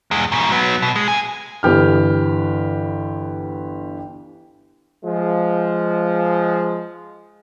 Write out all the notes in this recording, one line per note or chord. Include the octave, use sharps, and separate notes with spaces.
E2 G#3
G#2 B2
F#3 B3
B2
G#3
C#3 G#5
G1 E3 G4 F6
F3 G#3